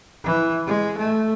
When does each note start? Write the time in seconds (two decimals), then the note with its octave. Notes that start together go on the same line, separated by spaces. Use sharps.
0.24 E3
0.66 G#3
0.98 A3